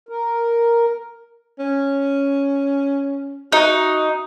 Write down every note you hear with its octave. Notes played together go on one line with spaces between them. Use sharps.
A#4
C#4
D#4 F#4